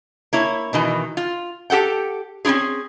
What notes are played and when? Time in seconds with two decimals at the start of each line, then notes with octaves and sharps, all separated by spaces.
0.33 A#3 E4 C#5
0.73 B2 D#3 E3
1.17 F4
1.70 G4 A4 F#5 G5
2.45 C4 C#4 E4 F4 G#4